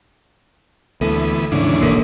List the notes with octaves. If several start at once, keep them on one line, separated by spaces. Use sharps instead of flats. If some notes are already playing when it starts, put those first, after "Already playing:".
D2 E3 G#3 A3 B3 A4
D#2 G#2 C#3 E3 D4
E1 A1 E2 A#3 A4 A#4